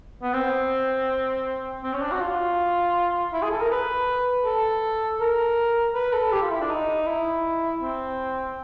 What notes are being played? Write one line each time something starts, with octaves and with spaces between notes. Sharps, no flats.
B3
C4
C4
C#4
D4
F#4
F4
E4
G#4
A4
A#4
B4
A4
A#4
B4
A4
G4
F4
E4
D4
D#4
E4
C4